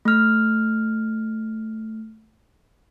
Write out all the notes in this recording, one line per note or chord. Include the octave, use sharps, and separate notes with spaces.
A3 F6